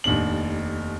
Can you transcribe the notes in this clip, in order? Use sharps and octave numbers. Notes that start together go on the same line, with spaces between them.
F1 D#2 D4 F#7